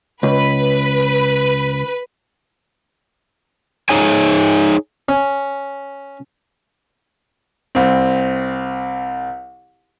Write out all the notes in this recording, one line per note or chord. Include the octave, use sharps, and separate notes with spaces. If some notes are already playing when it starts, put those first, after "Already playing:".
C#2 B4
D#4 G#4 C#5 G#5
C#4
C2 C4